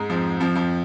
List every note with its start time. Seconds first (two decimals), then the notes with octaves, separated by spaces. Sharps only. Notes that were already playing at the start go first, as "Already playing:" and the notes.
Already playing: G#2 G#3
0.09 F2 F3
0.40 F2 F3
0.55 F2 F3